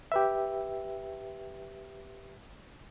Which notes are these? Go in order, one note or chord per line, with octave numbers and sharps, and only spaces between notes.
G4 B4 E5